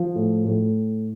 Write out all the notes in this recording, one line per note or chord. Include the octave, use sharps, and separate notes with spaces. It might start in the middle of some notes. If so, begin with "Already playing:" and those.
Already playing: F3
A2
A2